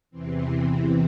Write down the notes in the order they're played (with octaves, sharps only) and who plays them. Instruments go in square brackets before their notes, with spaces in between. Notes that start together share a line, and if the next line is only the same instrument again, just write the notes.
[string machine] E2 C3 E3 C4